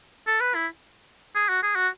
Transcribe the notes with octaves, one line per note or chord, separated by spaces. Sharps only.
A4
B4
E4
G#4
F#4
G#4
F#4